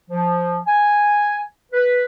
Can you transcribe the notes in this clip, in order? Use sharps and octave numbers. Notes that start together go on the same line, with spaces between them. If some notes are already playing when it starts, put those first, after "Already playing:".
F3
G#5
B4